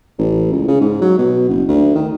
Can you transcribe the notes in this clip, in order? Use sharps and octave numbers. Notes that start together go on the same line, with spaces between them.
A1
C#2
C#3
G#2
F#3
B2
F#1
D2
D#3